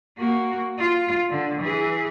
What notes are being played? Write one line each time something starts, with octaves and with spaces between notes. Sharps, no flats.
A#3 F#4
F4
D3
E3 G#4